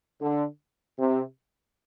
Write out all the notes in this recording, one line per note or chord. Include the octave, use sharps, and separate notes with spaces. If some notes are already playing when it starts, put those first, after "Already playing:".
D3
C3